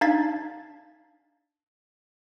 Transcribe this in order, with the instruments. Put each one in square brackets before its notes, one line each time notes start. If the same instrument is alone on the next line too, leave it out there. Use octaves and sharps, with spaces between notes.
[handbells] D4 D#4 F5 G#6 A6 B6